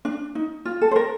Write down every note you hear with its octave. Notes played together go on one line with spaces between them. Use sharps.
D4
D#4
F4
A4
C5
A#4